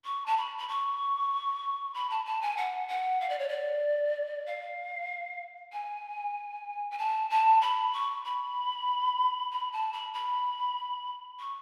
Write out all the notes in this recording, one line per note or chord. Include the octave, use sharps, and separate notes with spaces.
C#6
A5
B5
B5
C#6
B5
A5
A5
G#5
F#5
F#5
F5
D5
C#5
D5
F5
G#5
G#5
A5
A5
B5
C#6
B5
B5
A5
B5
B5
C#6